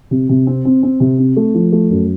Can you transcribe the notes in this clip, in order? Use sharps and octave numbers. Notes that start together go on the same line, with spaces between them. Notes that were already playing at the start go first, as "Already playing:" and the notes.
C3
C3
C4
C4
C4
C3
C4
A3
F3
A3
F#2